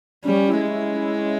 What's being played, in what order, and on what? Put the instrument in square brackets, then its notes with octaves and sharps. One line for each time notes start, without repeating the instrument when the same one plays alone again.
[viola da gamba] G3 [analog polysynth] C#4
[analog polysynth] E4
[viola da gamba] G#3
[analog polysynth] E4
E4